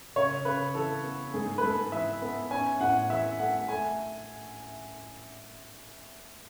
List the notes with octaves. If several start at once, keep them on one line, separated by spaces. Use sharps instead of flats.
C#3 C#5
C#3 B4
E3 A4
B3
G#2 G#4
B4
G#2 A4
E3 E5
B3
C#4 G#5
A2 F#5
E3 E5
A3 F#5
A3 G#5